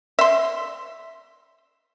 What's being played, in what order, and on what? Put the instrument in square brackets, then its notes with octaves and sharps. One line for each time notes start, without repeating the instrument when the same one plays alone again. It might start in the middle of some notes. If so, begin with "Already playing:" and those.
[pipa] E5 C6